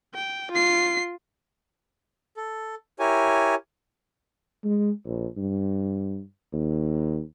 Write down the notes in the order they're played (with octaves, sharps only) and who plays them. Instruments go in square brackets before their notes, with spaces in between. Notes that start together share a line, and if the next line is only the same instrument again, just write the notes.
[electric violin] G5
F4 C7
[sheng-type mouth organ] A4
E4 G4 A#4 C#5 G#5
[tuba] G#3
A#1
G2
D#2